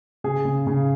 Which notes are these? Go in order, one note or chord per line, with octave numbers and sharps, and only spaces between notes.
C#3 G#4
C#3
C#3